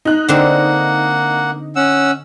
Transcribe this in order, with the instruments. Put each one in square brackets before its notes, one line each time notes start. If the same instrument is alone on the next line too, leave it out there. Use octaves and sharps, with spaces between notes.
[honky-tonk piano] D#4 F#6
[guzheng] D3 C4 [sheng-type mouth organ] A#3 F#5
[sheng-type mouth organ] C#4 F#5 E6